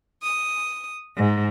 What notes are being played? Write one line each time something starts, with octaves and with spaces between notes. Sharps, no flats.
D#6
G#2